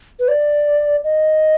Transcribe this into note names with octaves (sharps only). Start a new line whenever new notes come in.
B4
D5
D#5